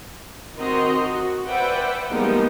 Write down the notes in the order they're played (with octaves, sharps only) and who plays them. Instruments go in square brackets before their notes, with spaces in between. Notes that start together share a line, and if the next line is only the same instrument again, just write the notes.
[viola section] D#3 C4 F#4 D#5 A#5 C6
F#4
B4 C5 D5 E5 F#5 G5
F3 G3 G#3 A#3 B3 D#4